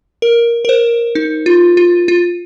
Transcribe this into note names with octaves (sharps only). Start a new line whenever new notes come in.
A#4
A#4
C5
D#4
F4
F4
F4